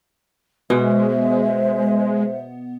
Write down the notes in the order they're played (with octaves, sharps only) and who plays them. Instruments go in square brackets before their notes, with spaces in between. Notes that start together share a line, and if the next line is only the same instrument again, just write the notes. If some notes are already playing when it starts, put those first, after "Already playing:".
[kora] B2 [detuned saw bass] G#3 [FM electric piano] B3 [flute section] C5 E5